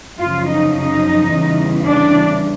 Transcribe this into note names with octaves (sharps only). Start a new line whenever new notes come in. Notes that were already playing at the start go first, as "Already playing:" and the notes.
F#2 C#3 F3 F4
D#4
D#4
E2 C#3 E3 G3
D4